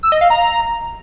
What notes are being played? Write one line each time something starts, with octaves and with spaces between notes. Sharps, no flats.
E6
D#5
F5
A#5